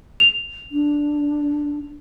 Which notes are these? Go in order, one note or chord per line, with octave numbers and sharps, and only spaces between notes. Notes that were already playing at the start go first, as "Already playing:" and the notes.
F7
D4